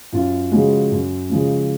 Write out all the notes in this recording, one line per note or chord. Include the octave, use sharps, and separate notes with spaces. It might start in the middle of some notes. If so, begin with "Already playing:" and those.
F#2 F4
C#3 F3 G#3 F#4
F#2
C#3 F3 G#3